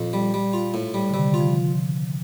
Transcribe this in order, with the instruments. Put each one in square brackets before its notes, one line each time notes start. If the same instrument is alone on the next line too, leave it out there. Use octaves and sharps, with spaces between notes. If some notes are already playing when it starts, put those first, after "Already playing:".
Already playing: [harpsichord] F2 [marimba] A#2
[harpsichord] G3
G3
F4
A2
G3
[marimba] D3
[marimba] C3 D#3 [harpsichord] G3
[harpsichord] F4
[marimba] F3